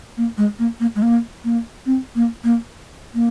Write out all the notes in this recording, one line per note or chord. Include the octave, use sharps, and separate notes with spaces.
A#3
G#3
A#3
A#3
G#3
A#3
A#3
C4
A#3
A#3
A#3